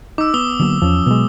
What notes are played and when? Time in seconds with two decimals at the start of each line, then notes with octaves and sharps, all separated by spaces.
0.18 D#4 D6 E6
0.34 B3 D#6 G7
0.60 D3 F#3 A#3
0.82 E2 F3 C#4
1.06 B2 F#3 G#3 B3